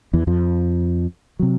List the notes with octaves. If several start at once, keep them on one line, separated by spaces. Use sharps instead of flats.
E2 E3
F2 F3
C3 F#3